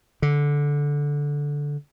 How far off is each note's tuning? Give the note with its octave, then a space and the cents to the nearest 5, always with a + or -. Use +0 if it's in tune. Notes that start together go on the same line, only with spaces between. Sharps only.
D3 -15